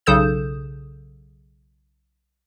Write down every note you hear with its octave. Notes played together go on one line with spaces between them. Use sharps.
B1 C#3 A4 D#6 G6 E7